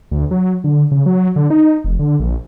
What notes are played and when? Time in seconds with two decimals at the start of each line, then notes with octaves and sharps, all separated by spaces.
0.11 D2
0.31 F#3
0.64 D3
0.91 C#3
1.06 F#3
1.36 D3
1.50 D#4
1.84 F1
1.99 D3
2.20 A#1